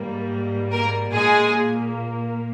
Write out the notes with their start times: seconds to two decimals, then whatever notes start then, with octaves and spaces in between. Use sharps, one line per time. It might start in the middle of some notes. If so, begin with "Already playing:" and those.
Already playing: G#2 G3 A#3
0.71 A#3 A#4
1.12 A#2 G#3 A#3 G#4